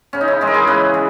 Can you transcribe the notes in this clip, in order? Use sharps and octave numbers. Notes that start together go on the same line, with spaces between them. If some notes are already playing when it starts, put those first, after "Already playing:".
C#3 C#4
D#4
E4
E3 G#3
A#4
G#4
C#3 B4
E3